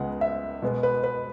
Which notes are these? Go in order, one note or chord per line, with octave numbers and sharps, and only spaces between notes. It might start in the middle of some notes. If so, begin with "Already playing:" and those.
Already playing: C#2 C#3 G#3 B3 F#5
E5
B2 G#3 B3
B4
B4